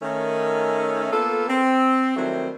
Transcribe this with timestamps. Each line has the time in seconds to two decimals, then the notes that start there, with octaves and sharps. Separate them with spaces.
0.02 D#3 A3 C#4
1.11 A#3 B3 F4 A4
1.48 C4
2.16 D#3 F#3 G3 A3 C4 E4